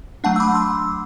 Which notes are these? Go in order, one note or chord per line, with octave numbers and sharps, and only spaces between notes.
F#3 A3 D4 F#5 A5
E6
B5 D6
C6 E6